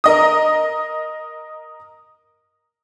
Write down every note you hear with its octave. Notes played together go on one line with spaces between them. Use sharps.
A#4 D#5 D#6